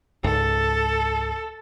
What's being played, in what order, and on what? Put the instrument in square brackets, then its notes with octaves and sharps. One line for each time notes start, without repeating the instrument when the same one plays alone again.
[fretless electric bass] C#2 G#2 [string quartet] A4